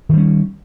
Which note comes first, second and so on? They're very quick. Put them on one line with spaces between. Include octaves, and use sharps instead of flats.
D#3 G3 C#4